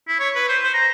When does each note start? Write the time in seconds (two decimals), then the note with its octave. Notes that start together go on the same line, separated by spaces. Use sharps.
0.08 E4
0.20 C#5
0.36 B4
0.49 C5
0.63 C5
0.74 A#5